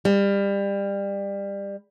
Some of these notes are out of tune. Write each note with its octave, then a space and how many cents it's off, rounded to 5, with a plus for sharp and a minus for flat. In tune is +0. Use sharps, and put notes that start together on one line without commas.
G3 +25